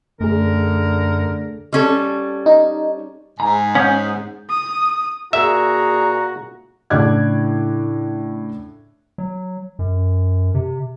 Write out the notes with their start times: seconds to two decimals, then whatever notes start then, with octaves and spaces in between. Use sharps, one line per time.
0.20 F#2 D3 A3 G#4 A#4
1.73 G3 C#4 A4
2.46 D#4
3.40 G#2 G#5 A#5
3.75 C#4 F#5 D#6 G6
4.50 D#6
5.33 A#2 F#4 G#4 E5 A#5
6.90 A2 C#3 D4 D6 F#6 G#6
9.18 F#3
9.79 F#2
10.55 C3